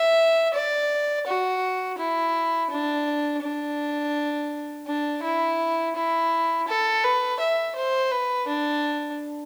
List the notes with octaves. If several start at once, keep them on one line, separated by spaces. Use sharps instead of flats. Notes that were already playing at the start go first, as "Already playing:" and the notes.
Already playing: E5
D5
F#4
E4
D4
D4
D4
E4
E4
A4
B4
E5
C5
B4
D4